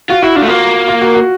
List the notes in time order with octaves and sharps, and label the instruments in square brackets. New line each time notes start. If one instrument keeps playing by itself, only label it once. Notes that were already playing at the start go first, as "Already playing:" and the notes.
[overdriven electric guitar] F4 [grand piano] F#4
[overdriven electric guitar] E4 [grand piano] F#4
[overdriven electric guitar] D4 [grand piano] F4
[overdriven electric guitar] A3
[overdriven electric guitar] A#3 [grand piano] F4
[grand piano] F4
F#4
F#4